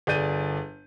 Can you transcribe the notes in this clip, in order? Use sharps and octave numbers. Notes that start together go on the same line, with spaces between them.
G1 G#4 D5 G6 D#7